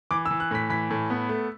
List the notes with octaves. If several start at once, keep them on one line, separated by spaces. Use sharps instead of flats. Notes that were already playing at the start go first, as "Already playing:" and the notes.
E3 D6
E6
E3
F#6
A2 B6
E3 B6
A2
B3
A3